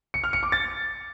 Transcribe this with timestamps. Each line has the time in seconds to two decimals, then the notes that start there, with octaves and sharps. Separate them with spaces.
0.14 C#7
0.24 F6
0.33 C#7
0.43 D6
0.52 A6